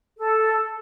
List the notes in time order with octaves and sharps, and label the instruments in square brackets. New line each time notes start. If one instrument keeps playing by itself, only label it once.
[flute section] A4